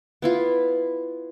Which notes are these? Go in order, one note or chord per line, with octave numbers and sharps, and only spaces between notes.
B3 E4 F4